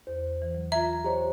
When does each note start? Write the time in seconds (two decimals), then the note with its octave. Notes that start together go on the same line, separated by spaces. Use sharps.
0.07 E2 C5
0.42 E3
0.55 F#3
0.72 F4 E5 A#5 G#6
1.04 G4 C5 C#5 D#5 A#5